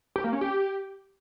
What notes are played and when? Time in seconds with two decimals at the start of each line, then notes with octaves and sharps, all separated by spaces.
0.16 G4
0.24 A#3
0.33 C#4
0.41 G4